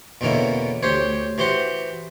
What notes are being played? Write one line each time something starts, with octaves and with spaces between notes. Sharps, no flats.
E2 B2 D3 A#3 C#4 E4
D2 G4 C5 C#5
E3 F#4 G4 C5 F#5